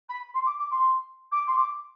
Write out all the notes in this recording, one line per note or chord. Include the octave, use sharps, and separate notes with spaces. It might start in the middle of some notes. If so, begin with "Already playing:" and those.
B5
C6
D6
D6
C6
D6
C6
D6